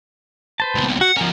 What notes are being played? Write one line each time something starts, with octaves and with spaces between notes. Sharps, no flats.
B4 C5 A5
C#2 B2
F#4 F#5
F3 C#4 A#4